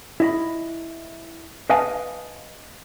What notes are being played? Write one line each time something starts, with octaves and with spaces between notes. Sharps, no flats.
E4 D#5 B5
B4 D#5 F5 G#5 A5